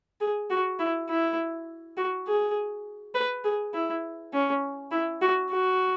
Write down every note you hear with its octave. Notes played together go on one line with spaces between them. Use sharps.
G#4
F#4
E4
E4
F#4
G#4
B4
G#4
E4
C#4
E4
F#4
F#4